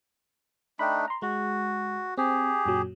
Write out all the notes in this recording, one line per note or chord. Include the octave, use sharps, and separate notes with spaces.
A3 D4 D#4 G5 B5
A#5 C6
G#3 F#4
C4 G4 G#4
F#2 A#2 F#3